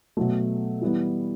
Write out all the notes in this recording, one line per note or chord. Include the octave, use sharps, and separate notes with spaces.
B2 F#3 A3
E3 G3 B3 E4